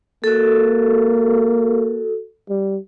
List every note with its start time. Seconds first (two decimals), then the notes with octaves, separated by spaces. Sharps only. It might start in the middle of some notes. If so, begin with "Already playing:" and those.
0.24 A#3 F#4 A4
2.50 G3